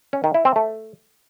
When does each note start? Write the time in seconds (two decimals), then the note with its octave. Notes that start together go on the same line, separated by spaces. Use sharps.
0.13 C#4
0.24 D#3
0.34 E4
0.45 C4
0.56 A3